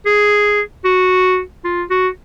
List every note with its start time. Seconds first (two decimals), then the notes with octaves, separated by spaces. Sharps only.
0.06 G#4
0.85 F#4
1.64 F4
1.90 F#4